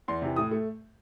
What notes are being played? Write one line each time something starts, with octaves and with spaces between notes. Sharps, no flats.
E2 C6
C3 E3
A2 D#6
A3